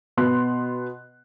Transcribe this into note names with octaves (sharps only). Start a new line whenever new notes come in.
B2 B3 C6 F#6